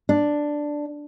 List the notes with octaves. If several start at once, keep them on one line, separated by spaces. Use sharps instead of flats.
D4